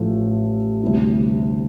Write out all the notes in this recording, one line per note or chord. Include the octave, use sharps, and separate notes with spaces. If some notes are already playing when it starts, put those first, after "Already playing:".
Already playing: A1 A2 F3 A3 E4
D2 C3 G3 B3 E4